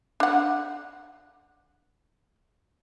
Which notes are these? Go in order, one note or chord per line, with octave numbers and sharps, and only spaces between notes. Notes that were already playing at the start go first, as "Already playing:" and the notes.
D4 F#5